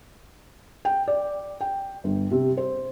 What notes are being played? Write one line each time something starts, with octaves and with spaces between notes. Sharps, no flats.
G5
D5
G5
G1
C3
C5